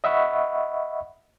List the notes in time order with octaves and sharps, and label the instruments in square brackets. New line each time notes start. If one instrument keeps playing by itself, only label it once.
[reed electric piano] D#5 E5 F#5 B5 C#6